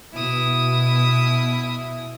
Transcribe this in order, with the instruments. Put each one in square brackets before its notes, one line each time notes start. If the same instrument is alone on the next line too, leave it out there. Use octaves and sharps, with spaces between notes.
[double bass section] B2 [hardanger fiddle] E4 D#6